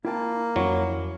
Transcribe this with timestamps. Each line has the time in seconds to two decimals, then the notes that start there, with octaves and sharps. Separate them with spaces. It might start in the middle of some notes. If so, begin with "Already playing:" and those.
0.05 A#3 E4 G5 A5
0.56 F2 F#3 C#4 E4 C#5